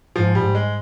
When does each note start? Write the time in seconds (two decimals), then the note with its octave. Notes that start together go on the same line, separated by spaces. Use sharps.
0.16 G#2 F3
0.35 G3
0.55 G#3